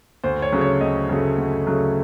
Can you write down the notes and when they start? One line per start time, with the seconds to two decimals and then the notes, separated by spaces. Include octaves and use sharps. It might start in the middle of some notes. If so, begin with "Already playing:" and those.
0.24 D2 C5
0.42 C#5
0.52 C#3 F#3 A3
0.61 C#5
0.81 D2 D#5
1.09 C#3 F#3 A3
1.38 D2
1.67 C#3 F#3 A3